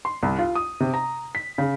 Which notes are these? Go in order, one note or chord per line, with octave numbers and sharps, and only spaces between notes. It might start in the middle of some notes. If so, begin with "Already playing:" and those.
C6
C2
F4
D#6
C3
A#5
B6
C#3